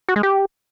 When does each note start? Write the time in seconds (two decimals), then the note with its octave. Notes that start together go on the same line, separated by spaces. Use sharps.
0.09 F#4
0.16 G#3
0.23 G4